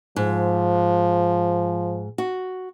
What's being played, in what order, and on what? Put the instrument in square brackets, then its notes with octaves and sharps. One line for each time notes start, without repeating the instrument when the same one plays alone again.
[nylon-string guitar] G#2 [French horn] F3
[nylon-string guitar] F#4